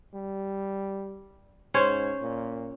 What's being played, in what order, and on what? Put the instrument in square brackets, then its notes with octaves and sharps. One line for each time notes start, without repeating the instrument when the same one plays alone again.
[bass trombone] G3
[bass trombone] G#2 [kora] C#4 C5 C#5
[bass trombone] A#2